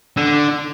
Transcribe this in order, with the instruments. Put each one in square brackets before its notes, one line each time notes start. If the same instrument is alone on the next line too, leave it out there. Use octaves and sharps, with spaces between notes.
[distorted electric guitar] D3